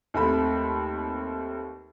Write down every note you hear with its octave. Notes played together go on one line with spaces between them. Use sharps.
D#2 A3 C4 B5